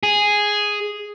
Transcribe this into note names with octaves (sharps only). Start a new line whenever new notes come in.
G#4